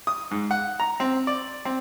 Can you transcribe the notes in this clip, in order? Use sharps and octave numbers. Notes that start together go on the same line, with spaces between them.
D#6
G#2
F#5
A#5
C4
D5
C4